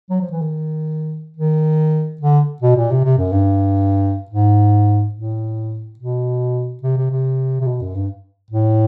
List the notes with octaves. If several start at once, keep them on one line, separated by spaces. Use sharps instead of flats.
F#3
F3
E3
D#3
D#3
D3
B2
A#2
C3
C3
F#2
G2
G#2
A2
B2
C3
C3
C3
C3
B2
F#2
G2
A2